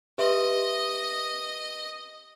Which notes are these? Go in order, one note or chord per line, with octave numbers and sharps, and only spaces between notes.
G4 B4 D#5 E5 C6